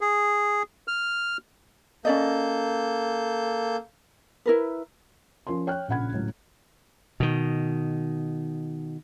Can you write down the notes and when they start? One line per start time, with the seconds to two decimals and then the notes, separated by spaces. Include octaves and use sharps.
0.01 G#4
0.88 F6
2.05 A#3 C#4 A4 D5 D#5 G6
4.46 E4 A#4 B4
5.47 F3 C#4 A#4 C6
5.67 C#5 G5 F6 F#6
5.88 A#1 A#2 C#3 F#5 B5 G#6
6.12 C#2 A2 F#3
7.20 B2 D#3